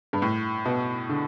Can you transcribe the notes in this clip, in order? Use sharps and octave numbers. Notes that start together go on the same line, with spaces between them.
G2
A2
B2
D3